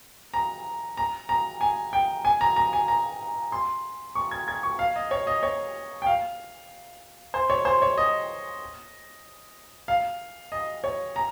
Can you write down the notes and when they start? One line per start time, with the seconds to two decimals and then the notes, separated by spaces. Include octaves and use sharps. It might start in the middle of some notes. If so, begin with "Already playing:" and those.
0.34 A#5
0.97 A#5
1.29 A#5
1.61 G#5
1.93 G5
2.25 G#5
2.41 A#5
2.56 A#5
2.73 G#5
2.88 A#5
3.52 C6
4.15 C#6
4.31 G#6
4.48 G#6
4.63 C#6
4.79 F5
4.96 D#5
5.11 C#5
5.27 D#5
5.43 C#5
6.02 G5
6.06 F5
7.34 C5
7.50 C#5
7.65 C5
7.82 C#5
7.97 D#5
9.88 F5
10.52 D#5
10.84 C#5
11.16 A#5